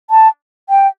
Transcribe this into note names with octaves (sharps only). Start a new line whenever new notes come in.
A5
G5